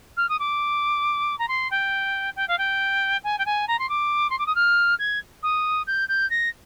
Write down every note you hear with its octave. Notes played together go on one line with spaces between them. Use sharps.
F6
D#6
D6
A#5
C6
G5
G5
F5
G5
G#5
G5
G#5
A#5
C6
D6
C6
D6
D#6
F6
G#6
D#6
G6
G6
A#6